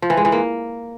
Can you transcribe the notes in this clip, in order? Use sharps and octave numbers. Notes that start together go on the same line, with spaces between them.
F3
E3
G#3
E3
A#3